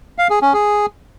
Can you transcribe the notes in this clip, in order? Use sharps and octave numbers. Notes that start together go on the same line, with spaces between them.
F5
G#4
C#4
G#4